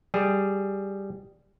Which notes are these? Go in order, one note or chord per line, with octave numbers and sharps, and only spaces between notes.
G3 G#4